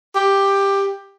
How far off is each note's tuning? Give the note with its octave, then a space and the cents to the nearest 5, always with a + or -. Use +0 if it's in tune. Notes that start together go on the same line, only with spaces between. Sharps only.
G4 +10